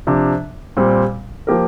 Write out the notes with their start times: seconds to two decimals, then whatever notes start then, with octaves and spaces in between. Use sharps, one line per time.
0.07 C3 F3 D4
0.77 A#2 G3 C4
1.47 F3 A#3 G4 A#4